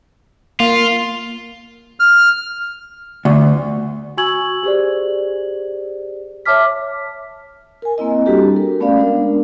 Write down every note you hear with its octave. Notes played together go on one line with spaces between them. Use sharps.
A#3 F4
F6
D2
F#4 G#5 C#6 E6 G#6 F#7
G4 G#4 C5 D5
C#5 E5 A5 D6 F6 B6
A#4 G#5
A#3 C4 E4 D#5
G3 A#3 D4 F#4 G4 A4
A#4
A3 B3 C#4 D5 F5
G#3 D4 A#4